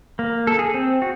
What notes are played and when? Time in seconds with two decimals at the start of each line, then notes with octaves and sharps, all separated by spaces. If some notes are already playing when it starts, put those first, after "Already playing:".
0.19 A#3
0.47 A4
0.59 G#4
0.74 C4
1.02 F#4